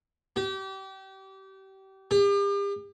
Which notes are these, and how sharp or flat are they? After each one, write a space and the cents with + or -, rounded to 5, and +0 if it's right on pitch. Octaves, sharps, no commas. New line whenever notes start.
G4 -30
G4 +40